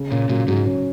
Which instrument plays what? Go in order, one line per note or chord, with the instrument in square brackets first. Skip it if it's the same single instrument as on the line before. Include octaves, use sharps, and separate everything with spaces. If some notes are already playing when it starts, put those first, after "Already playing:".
Already playing: [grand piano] C#3
[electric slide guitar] A#2 [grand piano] C#4
[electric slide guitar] A#2 [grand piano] F#3
[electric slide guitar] G#2 [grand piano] F#3
[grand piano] C#4